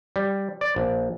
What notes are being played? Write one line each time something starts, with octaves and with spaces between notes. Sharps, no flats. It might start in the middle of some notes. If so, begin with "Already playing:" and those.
G3
D5
A#1